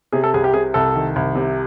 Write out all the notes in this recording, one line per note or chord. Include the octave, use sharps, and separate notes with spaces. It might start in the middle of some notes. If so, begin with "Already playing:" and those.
C3 G#4
A4
C2 G#4
G4
C3 G#4
C2 A4
D#3
C2
C3